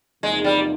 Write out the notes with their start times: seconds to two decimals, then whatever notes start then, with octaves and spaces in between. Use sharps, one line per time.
0.23 E2 C3 F3 G#3 A#3 D#4
0.44 G3